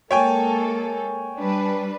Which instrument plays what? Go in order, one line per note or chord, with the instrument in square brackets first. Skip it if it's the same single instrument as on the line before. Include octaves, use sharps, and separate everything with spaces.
[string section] G#3 A#3 A4 [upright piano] C#5 G5 G#5
[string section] G3 D4 B4